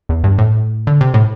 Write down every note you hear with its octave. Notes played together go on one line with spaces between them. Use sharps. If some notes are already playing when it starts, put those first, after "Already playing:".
E2
G2
A2
D3
C3
A2